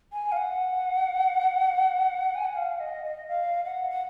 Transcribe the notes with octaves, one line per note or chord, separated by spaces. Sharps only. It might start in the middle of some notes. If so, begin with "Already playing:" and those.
G#5
F5
F#5
G#5
F#5
F5
D#5
D#5
F5
F#5
F#5